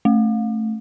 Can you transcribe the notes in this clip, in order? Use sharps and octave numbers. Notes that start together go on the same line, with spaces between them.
A3